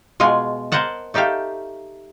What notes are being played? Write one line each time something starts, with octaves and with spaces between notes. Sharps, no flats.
B2 G#3 F4 G#4 G#5
A#4 C5 D#5 F#5 A5
A3 D#4 G4 A4 F5